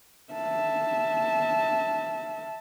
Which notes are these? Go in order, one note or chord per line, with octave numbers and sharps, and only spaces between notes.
E5 A5